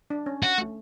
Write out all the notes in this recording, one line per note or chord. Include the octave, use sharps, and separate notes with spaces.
D4
C#4
F#4
A3